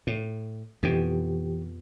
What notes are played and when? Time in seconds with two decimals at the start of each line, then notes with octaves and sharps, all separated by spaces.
0.07 A2
0.83 F2 B2 E3 G4